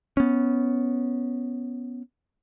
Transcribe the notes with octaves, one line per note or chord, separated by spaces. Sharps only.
B3 C#4